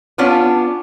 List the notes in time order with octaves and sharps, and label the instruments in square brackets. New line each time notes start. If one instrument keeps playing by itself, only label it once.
[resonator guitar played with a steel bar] B3 C#4 D4 F4